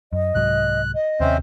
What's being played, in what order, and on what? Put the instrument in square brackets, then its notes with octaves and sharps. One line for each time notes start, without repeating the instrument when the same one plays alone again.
[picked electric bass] F#2 [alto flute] D#5
[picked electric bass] C2 G#2 F#3 [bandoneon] F#6
[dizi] D#5
[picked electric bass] D#2 C3 [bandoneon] C4 C#4 C5 [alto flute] E5